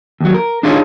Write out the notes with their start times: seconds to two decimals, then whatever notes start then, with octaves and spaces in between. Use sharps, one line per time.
0.20 D#2 F#3
0.34 A#4
0.63 D4 D#4 F4 G#4 C#5